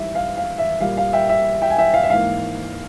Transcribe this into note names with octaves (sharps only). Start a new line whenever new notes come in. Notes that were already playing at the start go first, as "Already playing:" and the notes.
Already playing: G#2 E3 G3 E5
F5
F5
E5
A#2 G3 A#3 F5
F5
E5 G5
E5
E5 G5
G#5
E5 G5
F5
E5
G#2 E3 A#3 F5